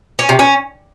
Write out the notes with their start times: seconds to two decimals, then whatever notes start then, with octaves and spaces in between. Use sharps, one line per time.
0.19 C#4
0.29 C3
0.39 C#4